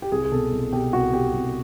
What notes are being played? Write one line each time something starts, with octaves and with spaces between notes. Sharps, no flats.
G4
C2 G#4
G#4
B2 A4
C2
B2 G4
C2 F#4
B2 G4
C2